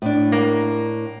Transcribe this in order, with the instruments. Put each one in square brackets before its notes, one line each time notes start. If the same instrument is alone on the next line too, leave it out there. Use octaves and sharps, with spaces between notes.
[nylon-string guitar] A2 D4
[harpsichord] A#3